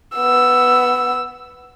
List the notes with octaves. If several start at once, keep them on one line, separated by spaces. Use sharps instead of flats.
B3 E6